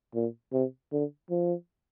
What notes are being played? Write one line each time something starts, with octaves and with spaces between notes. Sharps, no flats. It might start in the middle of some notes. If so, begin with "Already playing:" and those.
A#2
C3
D3
F3